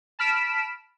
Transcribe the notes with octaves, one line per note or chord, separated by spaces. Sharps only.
A5 B5 F6 B6 D7 E7